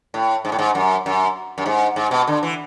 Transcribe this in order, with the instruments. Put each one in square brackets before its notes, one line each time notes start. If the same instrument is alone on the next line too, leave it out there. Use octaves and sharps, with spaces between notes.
[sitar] A2
G#2
A2
G#2
F#2
F#2
F#2
G#2
G#2
B2
D3
E3